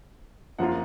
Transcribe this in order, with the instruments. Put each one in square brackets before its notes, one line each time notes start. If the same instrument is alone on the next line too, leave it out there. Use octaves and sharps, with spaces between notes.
[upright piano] F#2 F3 A#3 F4 F#5